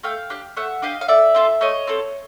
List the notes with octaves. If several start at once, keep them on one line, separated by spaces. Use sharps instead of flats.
A3 F5 G5
D4 G4
A3 E5 F#5
D4 G4 D#5 F5
F5
A3 D5 E5
C4 F4 A4
A3 C#5 D#5
C4 F4 A4